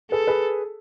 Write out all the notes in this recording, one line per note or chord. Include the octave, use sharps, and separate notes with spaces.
G#4 A4 B4
G#4 B4